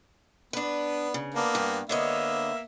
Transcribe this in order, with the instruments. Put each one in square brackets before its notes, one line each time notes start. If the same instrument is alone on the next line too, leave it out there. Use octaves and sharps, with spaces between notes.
[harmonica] B3 [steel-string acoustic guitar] D4 B4
[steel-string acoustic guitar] C#3
[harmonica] A#3 B3 D4
[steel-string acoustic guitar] G2
[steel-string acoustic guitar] D3 C#5 D#5 [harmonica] A#3 B3 E5